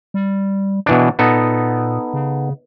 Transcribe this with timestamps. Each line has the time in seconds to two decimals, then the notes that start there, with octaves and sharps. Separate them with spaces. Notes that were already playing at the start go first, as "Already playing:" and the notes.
0.14 G3
0.86 B2 E3 D4
1.19 A#2 B3 D#4 A4
2.14 C#3